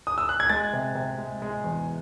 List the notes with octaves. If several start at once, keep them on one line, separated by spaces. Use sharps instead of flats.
D#6
E6
F#6
G#6
G#3 A6
C3
C3
G#3
G#3
E2